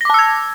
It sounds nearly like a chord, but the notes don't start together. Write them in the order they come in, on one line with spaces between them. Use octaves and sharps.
A#6 D6 A5 E6 G#6